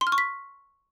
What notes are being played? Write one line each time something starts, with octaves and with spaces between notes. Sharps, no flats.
C6
F6
C#6
B6